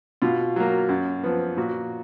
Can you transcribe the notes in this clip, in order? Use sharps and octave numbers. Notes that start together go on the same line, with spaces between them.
B2 F4
F#3 A#3
F#2
F3 B3
A#2 F#4